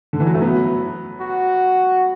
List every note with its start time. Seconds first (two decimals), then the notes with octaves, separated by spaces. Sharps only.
0.13 D3
0.20 E3
0.27 F#3
0.34 A3
0.42 F#3 B3
1.21 F#4